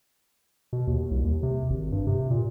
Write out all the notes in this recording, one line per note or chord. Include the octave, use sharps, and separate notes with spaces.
B2
D#2
C2
D#2
C3
G#1
G2
C3
A#2